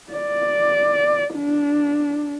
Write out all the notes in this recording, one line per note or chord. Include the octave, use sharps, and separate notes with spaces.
D5
D4